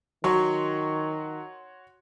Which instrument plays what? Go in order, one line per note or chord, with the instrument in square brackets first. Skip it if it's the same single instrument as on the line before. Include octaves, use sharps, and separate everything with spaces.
[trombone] D#3 [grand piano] F#3 [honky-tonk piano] F#4 C#5 C6